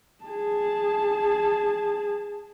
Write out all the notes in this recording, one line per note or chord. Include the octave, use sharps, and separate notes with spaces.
G#4 A5